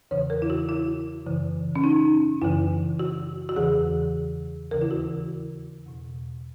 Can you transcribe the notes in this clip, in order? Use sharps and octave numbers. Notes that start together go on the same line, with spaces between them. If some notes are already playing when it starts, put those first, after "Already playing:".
E2 C#3 E3 C#5
A#4
E4
F#4
E4
F#2 C#3 E3
C#4
D#4
F#2 C#3 E3 E4
F#4
F#4
E2 C#3 E3 G#4
D#2 C#3 E3 A#4
E4
F#4
E2 B2